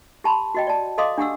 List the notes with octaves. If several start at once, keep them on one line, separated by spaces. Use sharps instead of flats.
G4 A5 B5 C6
F#4 D#5 G5
D5 A5
A4 D#5 F5 C6 D6 D#6
D4 G4 F#5 E6